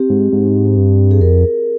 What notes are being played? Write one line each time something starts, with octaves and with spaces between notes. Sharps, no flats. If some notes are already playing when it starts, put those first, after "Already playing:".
Already playing: C4 G4
G#2
G#2
G2
G#4
F2 A#4